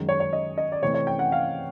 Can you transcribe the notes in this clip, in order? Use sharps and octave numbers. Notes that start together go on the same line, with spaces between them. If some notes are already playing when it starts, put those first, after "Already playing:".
Already playing: F#2 D#3 G#3
C#5
C#5
D#5
D#5
D5
C3 E3 A3 C4 C#5
C#5
G5
F#5
F5